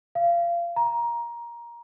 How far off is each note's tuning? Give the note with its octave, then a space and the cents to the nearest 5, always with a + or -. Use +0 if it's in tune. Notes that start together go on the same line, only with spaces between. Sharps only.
F5 -25
A#5 +15